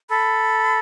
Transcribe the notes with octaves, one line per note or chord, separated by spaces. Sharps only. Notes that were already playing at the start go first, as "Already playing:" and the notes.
A4 B5